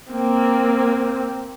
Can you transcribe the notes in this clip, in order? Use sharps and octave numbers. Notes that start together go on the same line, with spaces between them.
A#3 C4